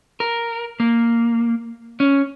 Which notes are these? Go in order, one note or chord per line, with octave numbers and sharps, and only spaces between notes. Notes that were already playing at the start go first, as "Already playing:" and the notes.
A#4
A#3
C#4